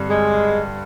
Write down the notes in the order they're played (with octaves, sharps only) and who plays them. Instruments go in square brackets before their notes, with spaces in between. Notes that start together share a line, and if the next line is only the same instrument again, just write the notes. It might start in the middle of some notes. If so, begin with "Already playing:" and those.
Already playing: [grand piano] G2 D3 G3 C4
[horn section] G#3